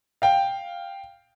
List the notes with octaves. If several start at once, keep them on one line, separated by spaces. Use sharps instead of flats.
F5 G5